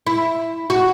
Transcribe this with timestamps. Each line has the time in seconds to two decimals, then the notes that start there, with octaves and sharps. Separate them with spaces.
0.07 E4
0.70 F#4